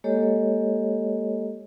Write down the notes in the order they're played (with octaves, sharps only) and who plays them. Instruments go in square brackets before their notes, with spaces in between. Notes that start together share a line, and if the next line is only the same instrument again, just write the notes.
[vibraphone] G#3 A#3 G4 A4 C#5 D#5